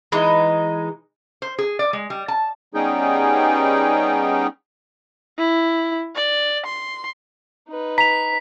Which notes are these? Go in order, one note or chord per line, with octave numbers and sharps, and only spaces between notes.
E3 G#3 D#4
C5
G#4
D5
G#3
G3
A5
G3 B3 C#4 D#4 G#4 G5
E4
D5
C6
D#4 B4
A#5 B6 F7